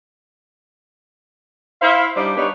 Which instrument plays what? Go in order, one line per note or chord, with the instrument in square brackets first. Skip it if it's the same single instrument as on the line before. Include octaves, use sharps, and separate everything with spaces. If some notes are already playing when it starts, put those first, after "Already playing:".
[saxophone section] E4 C5 E5 F5
G3 D4 D#4 C5 D5
B3 D4 D#4 G4 B4 C#5